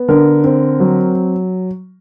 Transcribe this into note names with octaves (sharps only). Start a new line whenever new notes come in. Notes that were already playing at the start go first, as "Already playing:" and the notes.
Already playing: B3
D3 A#4
C4
F#3